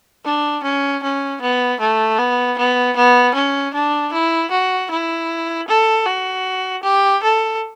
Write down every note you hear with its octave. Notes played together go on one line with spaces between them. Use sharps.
D4
C#4
C#4
B3
A3
B3
B3
B3
C#4
D4
E4
F#4
E4
A4
F#4
G4
A4